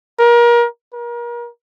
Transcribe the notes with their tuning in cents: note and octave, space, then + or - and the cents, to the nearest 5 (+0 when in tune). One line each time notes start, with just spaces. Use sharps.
A#4 +30
A#4 +35